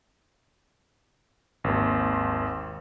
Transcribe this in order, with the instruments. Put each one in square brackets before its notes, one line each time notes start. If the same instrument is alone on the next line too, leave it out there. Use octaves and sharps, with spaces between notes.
[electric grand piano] G#1 D#2